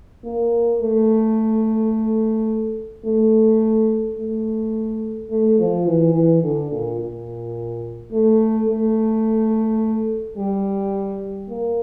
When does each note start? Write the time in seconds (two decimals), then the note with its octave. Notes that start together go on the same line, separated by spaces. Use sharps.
0.25 A#3
0.81 A3
3.06 A3
4.18 A3
5.30 A3
5.59 F3
5.87 E3
6.14 E3
6.43 D3
6.72 A#2
7.00 A#2
8.12 A3
8.69 A3
10.38 G3
11.50 A#3